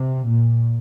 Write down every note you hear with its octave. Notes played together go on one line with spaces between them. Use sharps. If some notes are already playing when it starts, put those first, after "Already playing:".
Already playing: C3
A#2